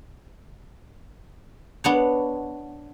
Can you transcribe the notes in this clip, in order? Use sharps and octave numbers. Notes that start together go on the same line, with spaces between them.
B3 D4 C#5